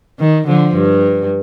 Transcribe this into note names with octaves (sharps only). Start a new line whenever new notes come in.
D#3
D3 F3
G2